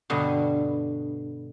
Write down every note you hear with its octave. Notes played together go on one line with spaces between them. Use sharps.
G2 B2 D3